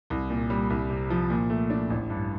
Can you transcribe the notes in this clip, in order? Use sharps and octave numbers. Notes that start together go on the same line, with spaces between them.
C2
A#2
G3
C2
C3
F3
A#2
A3
D4
A1
G2